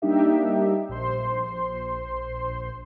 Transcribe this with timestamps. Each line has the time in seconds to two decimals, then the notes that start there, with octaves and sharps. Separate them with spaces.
0.02 G3 A#3 D4 D#4 G4 E5
0.89 A#1 C5 C6